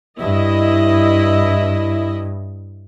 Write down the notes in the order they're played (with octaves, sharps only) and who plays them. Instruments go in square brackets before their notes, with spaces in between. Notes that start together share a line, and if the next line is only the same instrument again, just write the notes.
[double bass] G2 [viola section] E4 D#5